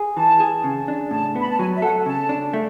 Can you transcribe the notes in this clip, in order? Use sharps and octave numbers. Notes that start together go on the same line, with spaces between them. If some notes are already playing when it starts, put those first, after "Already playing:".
Already playing: G#4
E3 A5
G#4
C#3
D4
A2 A5
B3 B5
A5
F#3 G#5
E5
A4 F#5
C#3 A5
D4
A3